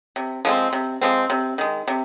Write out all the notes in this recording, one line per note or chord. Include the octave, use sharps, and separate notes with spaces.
C3
F3 G#3 C4
C3
F3 G#3 C4
C3
D#3 G#3
C3